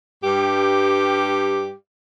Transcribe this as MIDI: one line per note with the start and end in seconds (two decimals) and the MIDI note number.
0.24 1.73 43
0.24 1.73 67